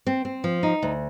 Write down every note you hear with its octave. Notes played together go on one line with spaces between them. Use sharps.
C4
C4
F3
D#4
D2